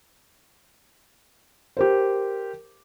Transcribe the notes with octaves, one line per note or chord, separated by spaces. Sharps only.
G4 A#4 C5